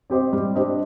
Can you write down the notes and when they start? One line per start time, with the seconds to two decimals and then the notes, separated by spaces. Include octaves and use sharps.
0.10 C4 G4 C5 D#5
0.33 G3
0.55 D4 G4 C5 D#5